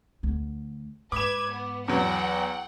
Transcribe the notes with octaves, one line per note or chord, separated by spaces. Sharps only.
D2
G#2 B4 D6 G#6 E7
B3
E2 F#3 F#5 G5